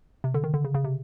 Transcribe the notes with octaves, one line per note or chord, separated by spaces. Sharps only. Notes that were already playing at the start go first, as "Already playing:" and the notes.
C3
D3
D#3
D3
C#3
C#3
C3